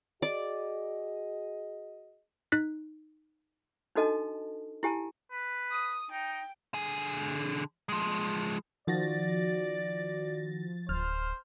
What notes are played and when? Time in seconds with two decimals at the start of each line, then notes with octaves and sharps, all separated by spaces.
0.22 F#4 G#4 D5 D#5
2.52 D#4 F#6 B6
3.95 D4 D#4 F#4 A4 D#5 A5
4.83 E4 G4 G#5 A5
5.32 B4
5.71 D#6
6.11 D#4 G5
6.74 D3 G#4
7.89 F3 G#3
8.87 D#3 F3 F#4 D5 A6 A#6
10.89 D1 C5 F6